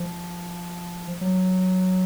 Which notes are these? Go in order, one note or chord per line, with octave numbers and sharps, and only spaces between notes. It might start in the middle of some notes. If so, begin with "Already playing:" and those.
Already playing: F3
F#3